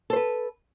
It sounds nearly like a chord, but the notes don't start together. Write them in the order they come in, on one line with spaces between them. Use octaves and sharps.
A4 C5 B4